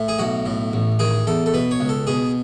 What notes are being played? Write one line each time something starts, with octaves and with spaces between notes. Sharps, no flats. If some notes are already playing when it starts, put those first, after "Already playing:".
Already playing: A2
G#4
B1 F#4
A2
A1
D#3 G#4
E2 A4
A4
B2 B4
C#5
C#2
A4
B2 G#4